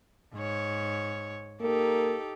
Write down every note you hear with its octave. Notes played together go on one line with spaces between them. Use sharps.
G#2 C#5
A#3 D#4 G4 A4